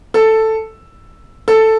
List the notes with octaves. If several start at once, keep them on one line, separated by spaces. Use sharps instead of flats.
A4
A4